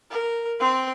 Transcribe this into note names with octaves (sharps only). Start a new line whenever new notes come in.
A#4
C4 C6